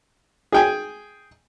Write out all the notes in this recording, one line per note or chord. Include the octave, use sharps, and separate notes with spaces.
G#4 G5 G#5